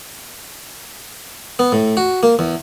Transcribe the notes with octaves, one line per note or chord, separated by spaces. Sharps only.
B3
A2
F#4
A#3
E2